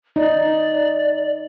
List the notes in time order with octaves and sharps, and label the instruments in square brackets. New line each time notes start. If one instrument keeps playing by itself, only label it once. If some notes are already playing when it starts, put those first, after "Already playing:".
[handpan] D#4 [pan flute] D5